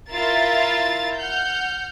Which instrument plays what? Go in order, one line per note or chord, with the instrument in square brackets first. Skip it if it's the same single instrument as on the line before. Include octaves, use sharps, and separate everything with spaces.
[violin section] E4 F4 A#4 E5 F5 A6
F#5 F6 G6